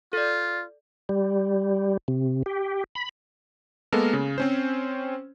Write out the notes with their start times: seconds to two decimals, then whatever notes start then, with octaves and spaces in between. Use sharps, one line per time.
0.13 F4 A4 D5
1.09 G3
2.08 C3
2.46 G4
2.95 B5
3.92 G#3 A#3 B3 A4 A#4
4.13 C#3
4.38 C4 C#4 C5